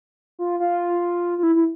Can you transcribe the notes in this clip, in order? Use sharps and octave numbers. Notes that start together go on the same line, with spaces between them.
F4
F4
F4
E4
E4